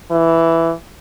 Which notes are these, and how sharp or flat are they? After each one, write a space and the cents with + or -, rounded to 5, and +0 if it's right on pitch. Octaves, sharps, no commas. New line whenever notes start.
E3 +5